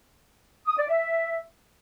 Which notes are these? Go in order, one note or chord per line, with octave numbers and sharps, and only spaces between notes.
D#6
D5
E5